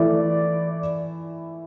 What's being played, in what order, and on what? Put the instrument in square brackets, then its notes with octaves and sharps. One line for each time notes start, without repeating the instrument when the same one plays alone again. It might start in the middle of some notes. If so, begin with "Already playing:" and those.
Already playing: [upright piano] E3 A3 E4 [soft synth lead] D5